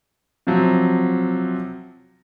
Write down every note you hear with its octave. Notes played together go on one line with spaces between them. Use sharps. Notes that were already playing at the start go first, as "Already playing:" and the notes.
C3 F3 F#3